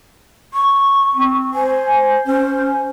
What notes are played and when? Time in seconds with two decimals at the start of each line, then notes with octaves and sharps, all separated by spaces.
0.54 C#6
1.14 C4
1.54 C5 G#5
2.27 C#4 C5